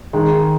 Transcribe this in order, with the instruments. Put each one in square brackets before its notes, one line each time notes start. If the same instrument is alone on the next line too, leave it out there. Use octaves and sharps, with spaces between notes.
[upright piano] D#3 G#3